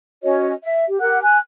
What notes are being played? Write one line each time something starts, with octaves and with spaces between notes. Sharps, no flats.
C#4 F#4 C#5 D#5
E5
G4
G4 A#4 F#5 F#6
G#5 F#6